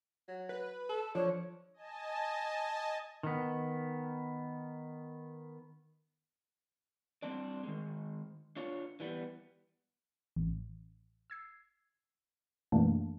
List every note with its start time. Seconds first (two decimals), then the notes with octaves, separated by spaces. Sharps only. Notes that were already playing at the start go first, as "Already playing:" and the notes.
0.28 F#3
0.49 B4
0.89 A4
1.15 F3 D4 C#5
1.74 D#5 G#5 A5
3.23 D#3 B3
7.22 G3 C4 D4 D5
7.63 D#3 G#3
8.56 D4 F4 C#5
9.00 E3 G3 B3
10.36 A1
11.30 E6 G#6 C7
12.72 F#2 B2 E3 A3 A#3 D4